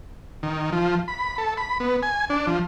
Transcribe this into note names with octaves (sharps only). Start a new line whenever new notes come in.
D#3
F3
B5
A4
B5
B3
G#5
D4
F3